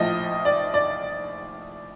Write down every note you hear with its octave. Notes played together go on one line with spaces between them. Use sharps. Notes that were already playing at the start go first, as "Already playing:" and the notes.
Already playing: A#1 A2 F3 D#5
D5
D5